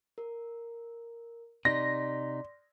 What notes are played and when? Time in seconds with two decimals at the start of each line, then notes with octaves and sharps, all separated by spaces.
0.18 A#4
1.65 C3 D#4 D5 C6 A#6 B6